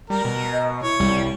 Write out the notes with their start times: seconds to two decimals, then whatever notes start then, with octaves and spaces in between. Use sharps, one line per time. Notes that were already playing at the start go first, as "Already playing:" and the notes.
0.10 G3 A#4
0.25 B2
0.52 D#5
0.83 E4 C#5
1.00 C2 G3